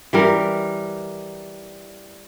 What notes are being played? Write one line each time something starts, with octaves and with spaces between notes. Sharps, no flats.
E3 G3 A#4